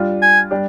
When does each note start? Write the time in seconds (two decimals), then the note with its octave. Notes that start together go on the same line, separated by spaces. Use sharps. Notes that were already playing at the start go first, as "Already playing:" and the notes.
Already playing: G3 D4 F4
0.22 G#5
0.51 G3 D4 G4